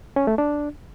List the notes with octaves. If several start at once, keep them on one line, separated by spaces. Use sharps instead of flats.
C#4
A3
D4